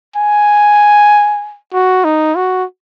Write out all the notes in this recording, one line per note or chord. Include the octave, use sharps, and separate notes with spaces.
G#5
F#4
D#4
F#4